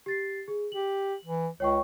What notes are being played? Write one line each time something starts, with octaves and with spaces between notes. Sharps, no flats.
G4 A6 C7
G#4
G4 F#7
E3
C#2 C#5 G5 C#6